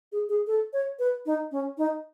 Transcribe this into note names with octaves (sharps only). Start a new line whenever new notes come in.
G#4
G#4
A4
C#5
B4
D#4
C#4
D#4